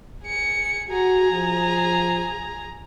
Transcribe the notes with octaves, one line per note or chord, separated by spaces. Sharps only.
G#4 C#7
F#4 G#4 A#5
F3